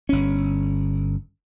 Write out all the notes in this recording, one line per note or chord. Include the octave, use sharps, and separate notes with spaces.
G1 C#4